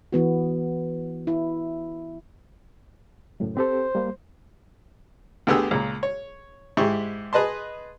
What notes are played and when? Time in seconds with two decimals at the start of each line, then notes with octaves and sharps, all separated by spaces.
0.12 E3 B3 F#4
1.27 E4
3.40 C#2 F#2 A2
3.57 C4 G4 A4 C5
3.95 G3 A#3
5.47 D2 D3 B3 G4 G#4 E6
5.71 C#2 A#2
6.03 C#5
6.77 G#2 G#3 E4 G4 C#6
7.33 G#4 B4 D#5 A5 C6